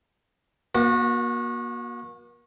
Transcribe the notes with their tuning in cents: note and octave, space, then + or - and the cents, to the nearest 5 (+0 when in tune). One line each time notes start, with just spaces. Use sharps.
A#3 +35 F#4 -25